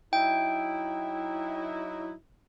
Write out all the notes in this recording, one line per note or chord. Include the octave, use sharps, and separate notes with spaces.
F#3 D#4 E4 G5